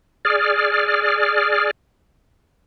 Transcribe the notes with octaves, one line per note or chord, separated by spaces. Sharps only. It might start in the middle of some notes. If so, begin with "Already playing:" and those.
G#4 D5 F6